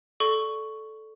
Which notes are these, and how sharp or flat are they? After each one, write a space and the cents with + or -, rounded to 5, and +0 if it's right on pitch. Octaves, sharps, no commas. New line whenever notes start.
A4 -10 D5 +0 C#6 +5